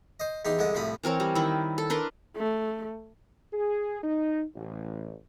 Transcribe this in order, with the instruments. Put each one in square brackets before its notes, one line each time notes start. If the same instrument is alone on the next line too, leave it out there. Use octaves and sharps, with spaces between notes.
[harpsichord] C5 D#5
E2 D#4 G4 C6
C2 D3 G#3 A5 D#6
C2 A2 F3 B5 D#6
[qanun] E3 C4 A#4 C#5
G3
D#3 E4
A4
D4 A#4 B4 C6
[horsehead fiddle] A3
[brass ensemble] G#4
D#4
A1